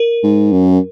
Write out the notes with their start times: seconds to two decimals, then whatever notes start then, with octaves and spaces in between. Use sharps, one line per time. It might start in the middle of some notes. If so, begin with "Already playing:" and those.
Already playing: A#4
0.23 G#2
0.52 F#2